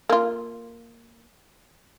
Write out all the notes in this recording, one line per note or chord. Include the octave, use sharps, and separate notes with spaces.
A#3 F4